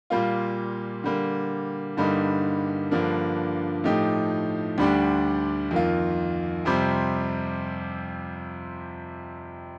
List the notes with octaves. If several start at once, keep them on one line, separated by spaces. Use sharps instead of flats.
A#2 G3 A#3 F4
D3 G3 A#3
G2 D3 G3 A#3 D#4
G2 D3 F3 A#3 D4
A2 F3 A3 D#4 G4
D2 D3 G3 D4 G4
F2 D#3 A#3 F4
F2 C3 G3 C4